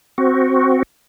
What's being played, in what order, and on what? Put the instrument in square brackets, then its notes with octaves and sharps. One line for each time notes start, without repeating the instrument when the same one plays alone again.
[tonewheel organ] C4 F#4